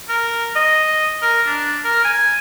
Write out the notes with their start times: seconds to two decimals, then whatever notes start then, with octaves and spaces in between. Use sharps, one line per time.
0.09 A#4
0.56 D#5
1.22 A#4
1.47 D4
1.84 A#4
2.05 G#5